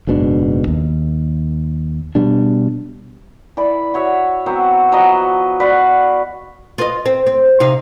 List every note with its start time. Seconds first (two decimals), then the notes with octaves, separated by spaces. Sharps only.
0.07 F#1 G#2 B2 D4
0.67 D#2
2.15 B2 G3 D4
3.57 E3 D5 B5
3.94 F#4 C#5 E5
4.46 F#3 B3 C4
4.92 F3 F#3 B4 D#5
5.60 F#4 B4 D5 F5
6.78 F4 B4 D#5
7.06 C4
7.27 C4
7.60 C3 D#4 F5